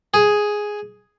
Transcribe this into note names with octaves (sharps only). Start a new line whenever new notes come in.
G#4